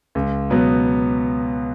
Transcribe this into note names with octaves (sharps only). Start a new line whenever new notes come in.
C#2
B2 F#3 B3